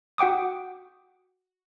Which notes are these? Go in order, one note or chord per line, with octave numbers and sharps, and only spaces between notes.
F#4 F#5 G5 D6 D#6